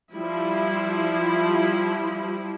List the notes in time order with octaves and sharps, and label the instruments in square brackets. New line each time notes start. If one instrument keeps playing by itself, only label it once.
[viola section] F3 G3 E4